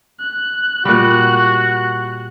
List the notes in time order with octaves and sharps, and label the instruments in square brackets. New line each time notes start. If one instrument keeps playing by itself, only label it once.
[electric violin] F#6
[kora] A#2 G3 [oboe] F#4